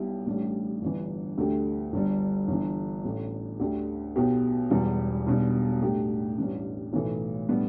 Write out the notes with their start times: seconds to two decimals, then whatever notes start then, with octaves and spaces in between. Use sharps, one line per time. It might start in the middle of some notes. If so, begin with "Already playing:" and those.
Already playing: B1 B2 G3 E4 G4
0.26 A1 A2 G3 D4
0.82 G1 G2 E3
1.38 D2 D3 A3 G4
1.93 G1 G2 G3
2.48 G1 G2 E3
3.04 A1 A2 A3
3.60 D2 D3 A3 D4 G4
4.15 B1 B2 B3 G4
4.70 E1 E2 E3 G3
5.27 B1 B2 G3 D4
5.82 A2 A3 D4 G4
6.37 A1 G2 E3 G3 D4
6.93 B1 A2 E3 A3
7.49 A2 G3 B3 D4